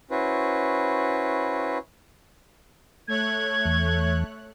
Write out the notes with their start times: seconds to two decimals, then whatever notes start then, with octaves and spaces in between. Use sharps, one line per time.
0.11 C#4 E4 F#4 B4 C5
3.08 A3 C#5 F#6 G#6
3.65 E2